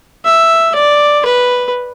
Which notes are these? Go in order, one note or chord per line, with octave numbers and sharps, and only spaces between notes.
E5
D5
B4